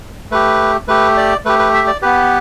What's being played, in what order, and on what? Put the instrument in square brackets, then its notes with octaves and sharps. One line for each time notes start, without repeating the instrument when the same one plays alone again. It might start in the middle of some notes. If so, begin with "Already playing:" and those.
[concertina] A3 G4 B4
A3 G4 B4
D5
A3 G4 B4
B4
E5
D5
B3 G4 B4